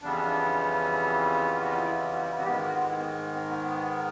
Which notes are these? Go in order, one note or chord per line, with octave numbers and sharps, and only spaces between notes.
F2 C#3 E3 G3 B3 D4
F4
F#4
F4
E4
F#4
F#4
G#2 D#3 G#3 B3 G4
F#4
F4
E4
B3
C4
B3
C4
B3
B3